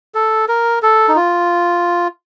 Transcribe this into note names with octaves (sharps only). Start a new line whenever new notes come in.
A4
A#4
A4
D#4
F4